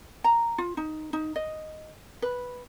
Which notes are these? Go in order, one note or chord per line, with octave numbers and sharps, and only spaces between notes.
A#5
F4
D#4
D#4
D#5
B4